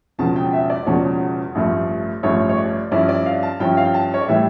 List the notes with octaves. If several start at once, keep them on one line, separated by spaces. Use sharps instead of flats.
E1 E2 C#3 F3 A5
G5
E5
D5
E1 E2 C#3 F3 C#5
A1 G2 F3 A3
A1 G2 F3 A3 C#5
C#5
D5
G2 F3 C#4 E4 D5
D5
F5
A5
G2 F3 C#4 E4 G5
F5
G5
A5
C#5
D5
A2 E3 G3 E5